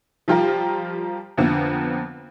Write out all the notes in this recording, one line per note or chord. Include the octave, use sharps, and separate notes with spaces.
F3 G3 F4 G4 A#4
F2 D3 A#3 B3